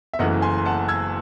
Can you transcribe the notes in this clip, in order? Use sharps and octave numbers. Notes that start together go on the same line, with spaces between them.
E5
F#1 F#2 E3 A3 D#5 F#5
G#5 C6
C6
F#5 A5
E6 G#6